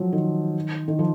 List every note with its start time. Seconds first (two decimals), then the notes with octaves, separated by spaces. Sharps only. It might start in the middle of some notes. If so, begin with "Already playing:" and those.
Already playing: F3 F#3
0.12 D#3
0.88 D#3
0.99 F3